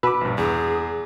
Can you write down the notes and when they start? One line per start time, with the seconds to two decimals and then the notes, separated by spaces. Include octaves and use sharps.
0.03 B2 B4 D6 E6
0.21 A#1 G2
0.38 E2 G#4